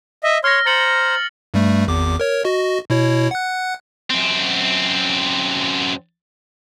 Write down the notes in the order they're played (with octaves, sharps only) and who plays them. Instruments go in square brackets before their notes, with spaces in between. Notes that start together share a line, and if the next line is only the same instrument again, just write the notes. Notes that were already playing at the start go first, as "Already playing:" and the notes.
[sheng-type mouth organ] D#5 E5
[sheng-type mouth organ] C#5 C6 [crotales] F6 A#6
[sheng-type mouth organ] C5 A#5 [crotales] A6 C#7 F#7
[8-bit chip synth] G2 G3 A3
G#1 E2 D6
A#4 C#5
F#4 D#5
B2 E4 C#5
F#5 F#6
[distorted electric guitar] F#2 C4